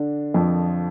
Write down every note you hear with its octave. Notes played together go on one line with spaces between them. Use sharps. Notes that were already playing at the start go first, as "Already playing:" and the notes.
Already playing: D3 D4
F2 F3